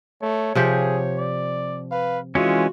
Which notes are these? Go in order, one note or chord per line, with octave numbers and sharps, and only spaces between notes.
A3 C#5
C3 F3 G4 G#4
D5
B4 F5
E3 G#3 C#4 F4 F#4